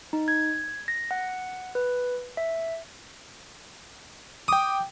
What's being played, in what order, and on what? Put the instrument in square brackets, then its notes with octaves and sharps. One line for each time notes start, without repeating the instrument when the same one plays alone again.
[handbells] D#4
G#6
A#6
F#5
B4
E5
[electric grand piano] G5 D6 [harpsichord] D#6